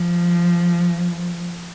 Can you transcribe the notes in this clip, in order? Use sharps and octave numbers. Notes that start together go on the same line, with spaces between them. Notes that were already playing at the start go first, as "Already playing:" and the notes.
Already playing: F3